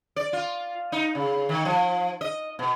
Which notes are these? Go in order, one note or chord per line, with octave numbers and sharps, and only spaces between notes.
D5
F4
D#4
C#3
D#3
F3
D#5
B2